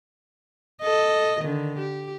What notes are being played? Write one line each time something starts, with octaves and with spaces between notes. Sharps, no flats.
A4 D#5
D3 D#3
G4